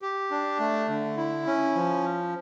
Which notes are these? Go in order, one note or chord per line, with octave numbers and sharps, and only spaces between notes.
G4
D4
A3
D3
E4
C#4
F3